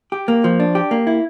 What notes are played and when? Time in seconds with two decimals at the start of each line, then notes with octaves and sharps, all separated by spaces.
0.12 G4
0.28 A#3
0.44 F3
0.60 D4
0.75 G4
0.91 A#3
1.07 E4